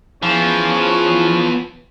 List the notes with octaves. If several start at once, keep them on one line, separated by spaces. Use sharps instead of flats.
E3 F3 B3 C#4 G#4 C#5